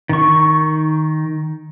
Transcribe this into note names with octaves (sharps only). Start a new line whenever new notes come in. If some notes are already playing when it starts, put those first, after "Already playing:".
D#3 C#6